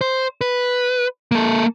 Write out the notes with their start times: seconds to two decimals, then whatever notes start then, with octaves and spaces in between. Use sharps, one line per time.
0.01 C5
0.41 B4
1.32 A#3 A4